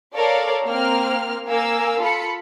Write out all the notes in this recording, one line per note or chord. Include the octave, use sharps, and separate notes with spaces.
A4 A#4 C#5 D5 F5
A#3 C4 F6
A#3 A#4 F5 G#5 E6
F4 A4 B5 C#7